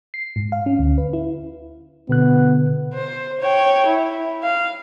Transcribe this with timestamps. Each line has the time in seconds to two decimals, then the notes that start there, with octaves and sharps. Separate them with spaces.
0.14 C7
0.36 G#2
0.52 F5
0.66 C#4
0.79 D2
0.98 B4
1.13 E4
2.09 B2 D3 B3 F#6
2.94 C5
3.40 C#5 G5
3.86 E4
4.43 F5